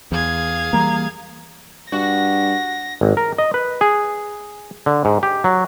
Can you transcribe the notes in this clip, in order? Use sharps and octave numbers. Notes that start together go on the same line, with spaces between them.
E2 G#4 F5 G#6
E3 G3 A#3 A#5
G2 F#4 A#6
G#1
A#4
D#5
B4
G#4
D3
G#2
G4
F#3